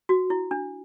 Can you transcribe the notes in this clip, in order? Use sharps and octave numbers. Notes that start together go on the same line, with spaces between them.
F#4
E4
D4